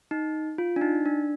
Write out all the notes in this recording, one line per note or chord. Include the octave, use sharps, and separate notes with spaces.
D#4
F4
D4
D#4
D4